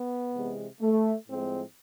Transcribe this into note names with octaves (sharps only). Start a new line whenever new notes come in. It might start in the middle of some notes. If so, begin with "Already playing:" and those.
Already playing: B3
C3 E3 G#3
A3
A2 F3 G#3 C4